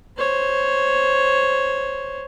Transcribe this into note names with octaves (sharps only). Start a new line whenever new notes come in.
C5 C#5